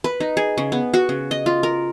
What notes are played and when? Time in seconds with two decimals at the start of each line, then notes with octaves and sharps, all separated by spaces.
0.04 B4
0.20 D#4
0.37 G#4
0.58 C#3
0.72 B3
0.94 F#4
1.09 C#3
1.31 D#5
1.46 F4
1.63 A#4